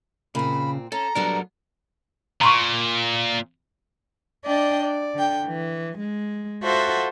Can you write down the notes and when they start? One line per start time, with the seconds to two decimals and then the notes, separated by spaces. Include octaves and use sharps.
0.35 A#2 C#3 C4 B5
0.92 C#4 A4 A#5
1.15 F#3 G3 B3 D4 A4 A#4
2.41 A#2 A#5 C6 C#6
4.45 D4 D5 D#5 G5
4.83 D5
5.14 D3 G5
5.47 E3
5.99 G#3
6.63 F4 F#4 A4 C5 E5 F#5